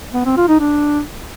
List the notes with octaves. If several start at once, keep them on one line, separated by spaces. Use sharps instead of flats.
B3
C4
F4
D#4
D4